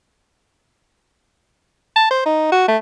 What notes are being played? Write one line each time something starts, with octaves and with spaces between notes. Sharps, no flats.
A5
C5
D#4
F#4
A3